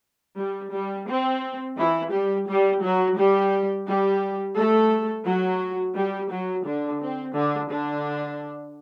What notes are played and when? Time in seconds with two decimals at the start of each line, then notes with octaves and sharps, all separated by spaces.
0.38 G3
0.73 G3
1.08 C4
1.77 E3 E4
2.12 G3 G4
2.47 G3 G4
2.83 F#3 F#4
3.16 G3 G4
3.86 G3 G4
4.56 A3 A4
5.26 F#3 F#4
5.96 G3 G4
6.31 F#3 F#4
6.65 D3 D4
7.01 C4
7.35 D3 D4
7.70 D3 D4